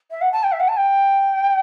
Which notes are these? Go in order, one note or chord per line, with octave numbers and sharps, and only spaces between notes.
E5
F#5
A5
G5
E5
F#5
A5
G5